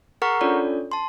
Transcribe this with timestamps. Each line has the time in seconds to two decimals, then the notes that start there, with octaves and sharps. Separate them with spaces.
0.22 G#4 A#4 F#5 A#5 C#6 F6
0.41 C#4 D4 F4 A4 C#5 D5
0.92 A5 C6